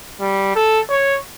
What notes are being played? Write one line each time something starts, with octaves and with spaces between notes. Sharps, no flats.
G3
A4
C#5